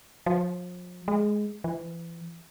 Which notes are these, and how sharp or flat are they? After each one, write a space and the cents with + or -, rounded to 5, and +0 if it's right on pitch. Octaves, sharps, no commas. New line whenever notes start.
F3 +40
G#3 +10
E3 +35